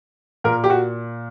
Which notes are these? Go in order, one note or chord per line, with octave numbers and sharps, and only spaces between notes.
A#2 A#4
G4
F#4